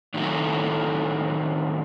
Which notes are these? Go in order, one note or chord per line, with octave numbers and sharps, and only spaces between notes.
A2 D3 D#3 F#3 A3 F#4